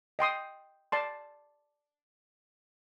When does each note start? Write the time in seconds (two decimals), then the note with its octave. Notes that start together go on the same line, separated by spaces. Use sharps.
0.19 D#5 G5 C6 D#6
0.92 D5 A5 C6